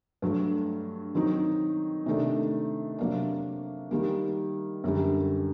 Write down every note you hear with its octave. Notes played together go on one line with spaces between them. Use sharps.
G2 F#3 A3
D#3 F#3 C4 D#4
C3 D#3 A3 D4
C3 F#3 A#3 D4
D#3 G3 A#3
F#2 D3 G3